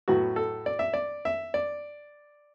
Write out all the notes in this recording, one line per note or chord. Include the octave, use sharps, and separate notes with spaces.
A2 F#3 B3 F#4
A4
D5
E5
D5
E5
D5